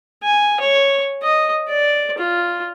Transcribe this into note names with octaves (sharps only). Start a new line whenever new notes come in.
G#5
C#5
D#5
D5
F4